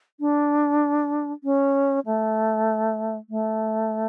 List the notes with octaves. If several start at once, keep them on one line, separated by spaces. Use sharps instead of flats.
D4
C#4
A3
A3